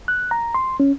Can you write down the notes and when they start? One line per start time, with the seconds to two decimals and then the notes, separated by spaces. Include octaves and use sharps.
0.08 F#6
0.31 A#5
0.55 C6
0.80 C#4